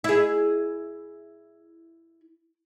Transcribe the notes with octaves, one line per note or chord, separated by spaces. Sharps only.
E4 G#4